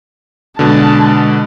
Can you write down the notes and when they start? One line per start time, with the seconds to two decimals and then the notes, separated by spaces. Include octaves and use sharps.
0.59 B2 D3 G#3 A5